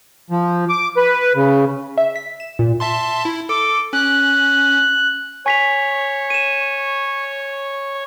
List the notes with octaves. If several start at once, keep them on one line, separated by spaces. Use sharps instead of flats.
F3
D6
B4
C#3
E5
B6
E7
A#2
E5 A5 C6
E4
A4 D6
C#4 F#6
C#5 G#5 B6 F7
D#7 E7